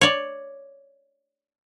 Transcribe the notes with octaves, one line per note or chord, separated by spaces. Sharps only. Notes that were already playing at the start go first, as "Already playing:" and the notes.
C#5 D5